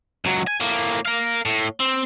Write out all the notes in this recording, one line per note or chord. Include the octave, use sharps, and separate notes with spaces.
C#2 F#3
G#5
A2 A#3
A#4 F5
A2
C4